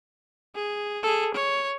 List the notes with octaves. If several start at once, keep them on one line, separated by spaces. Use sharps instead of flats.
G#4
G#4 A4
C#5